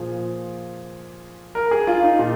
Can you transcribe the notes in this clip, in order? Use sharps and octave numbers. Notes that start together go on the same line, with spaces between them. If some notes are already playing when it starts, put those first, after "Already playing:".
Already playing: A#2 F3 G#4
A#4
G#4
F4
D#4
A#2